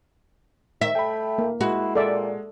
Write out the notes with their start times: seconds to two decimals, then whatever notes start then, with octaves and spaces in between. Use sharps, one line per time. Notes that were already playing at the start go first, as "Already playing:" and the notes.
0.81 D#3 E5
0.95 A3 G5 B5
1.38 A#3
1.61 G#3 E4 F#4
1.95 A#2 G#3 A4 D5 E5